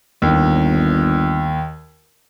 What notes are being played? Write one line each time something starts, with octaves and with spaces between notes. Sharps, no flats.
G1 D#2